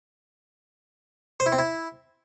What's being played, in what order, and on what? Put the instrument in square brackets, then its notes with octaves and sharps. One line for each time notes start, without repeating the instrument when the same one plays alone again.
[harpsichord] C5
E4
C4
E4